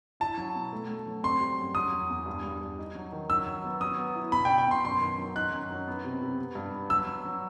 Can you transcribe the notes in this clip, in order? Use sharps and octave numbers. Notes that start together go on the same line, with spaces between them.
E4 A5
F#3
B2
A3
A3
F#3
C4 C6
G3
F#2
F#3 D#6
E2
E2
G2
G2
G2
D#4
F#3
D#3
F#3 E6
F#3
B3
F#3 D#6
B3
E4
B2 B5
G5
B2
G5
B2 C6
F#2 C6
D#3
F#3
D#4 F#6
F#2
F#3
B3
C3
C3
B3
G2
B3
F#3 E6
F#3
F#3